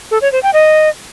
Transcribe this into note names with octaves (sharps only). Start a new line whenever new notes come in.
A4
C#5
C5
G5
D#5